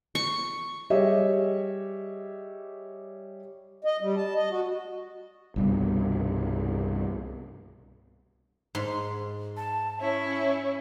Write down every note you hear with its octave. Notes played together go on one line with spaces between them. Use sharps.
C#6
G3 G4 G#4 C#5 D#5 E5
D#5
G3
A5
D#5
F#4
C2 G2 B2
G#2 C6
A5
C#4 E4 C#5